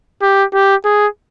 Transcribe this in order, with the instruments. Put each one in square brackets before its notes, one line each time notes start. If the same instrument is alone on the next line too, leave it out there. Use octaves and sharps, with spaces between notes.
[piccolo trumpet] G4
G4
G#4